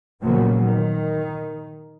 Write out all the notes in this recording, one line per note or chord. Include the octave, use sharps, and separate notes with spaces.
A#2 C#3 F3 F#3 A#3 B3
D#3